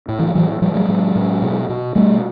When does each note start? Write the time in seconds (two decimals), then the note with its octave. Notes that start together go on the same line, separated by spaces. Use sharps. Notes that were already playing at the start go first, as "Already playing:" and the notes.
0.08 A2
0.19 E3
0.27 F3
0.35 A2 E3 F#3
0.61 A2 F3 G3
0.75 F#3 G#3
0.88 A2
1.15 A2
1.42 B2
1.69 B2
1.95 B2 G3 A3